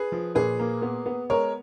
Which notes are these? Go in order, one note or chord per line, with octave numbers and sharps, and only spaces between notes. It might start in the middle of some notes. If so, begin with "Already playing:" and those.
Already playing: G#4 B4
F3
A#2 G#4 B4
A#3
B3
B3
G#3 A#4 C#5